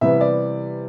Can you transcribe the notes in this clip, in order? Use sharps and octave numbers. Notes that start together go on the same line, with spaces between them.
C3 E3 G3 B3 E5
D5